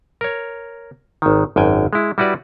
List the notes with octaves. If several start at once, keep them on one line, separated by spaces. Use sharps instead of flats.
A#4 C#5
G#1 D#3
G#1 F#2 G5 G#5
G#3 E4
G3 E4 F#4 B4 D5